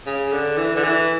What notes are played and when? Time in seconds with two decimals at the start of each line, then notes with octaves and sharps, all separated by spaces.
0.06 C#3
0.32 D3
0.58 E3
0.76 D3
0.84 E3